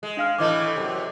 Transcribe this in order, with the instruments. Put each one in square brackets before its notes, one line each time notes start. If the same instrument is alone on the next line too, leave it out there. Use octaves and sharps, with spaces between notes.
[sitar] G#3
[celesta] D4 F5 F6
[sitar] A2 E3 A3 [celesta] D#5 D6
[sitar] F#2 C3